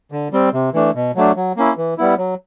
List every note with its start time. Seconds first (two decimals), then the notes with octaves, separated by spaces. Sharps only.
0.12 D3
0.33 G3 C4
0.53 C3
0.74 E3 A3 D4
0.95 B2
1.16 F#3 A3 D4
1.36 F#3
1.57 A#3 C#4 E4
1.78 E3
1.98 G3 B3 E4
2.18 F#3